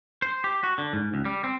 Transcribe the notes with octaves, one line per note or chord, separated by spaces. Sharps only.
C5
G4
F#4
D3
G#2
C#2
G3
C4